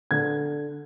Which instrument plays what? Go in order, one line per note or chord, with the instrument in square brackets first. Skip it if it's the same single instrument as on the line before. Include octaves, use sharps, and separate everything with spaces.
[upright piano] D3 G#6